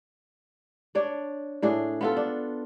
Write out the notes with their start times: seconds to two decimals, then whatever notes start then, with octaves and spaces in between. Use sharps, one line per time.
0.95 D4 C#5 D5
1.62 A2 D4 G#4
2.01 B3 F4 A4
2.17 D4